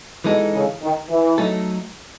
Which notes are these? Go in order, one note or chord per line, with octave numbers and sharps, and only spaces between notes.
B2 E3 G#3 D#4 A4
C#3
D#3
E3
F#3 A3 D#4 A4